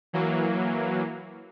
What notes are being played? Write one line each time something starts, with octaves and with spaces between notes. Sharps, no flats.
E3 F#3 A#3